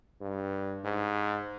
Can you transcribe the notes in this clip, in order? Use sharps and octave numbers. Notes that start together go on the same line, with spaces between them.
G2
G#2